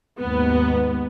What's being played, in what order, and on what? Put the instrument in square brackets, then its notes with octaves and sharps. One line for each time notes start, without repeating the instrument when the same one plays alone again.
[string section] D#2 G#2 B3